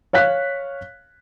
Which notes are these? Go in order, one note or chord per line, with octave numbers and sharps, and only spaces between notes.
C#5 F5 F#6 B6